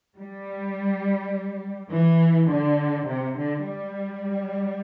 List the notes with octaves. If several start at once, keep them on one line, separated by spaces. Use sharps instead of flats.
G3
E3
D3
C3
D3
G3